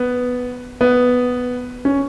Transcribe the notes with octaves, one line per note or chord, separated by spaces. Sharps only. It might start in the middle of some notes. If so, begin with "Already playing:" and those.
Already playing: B3
B3
C#4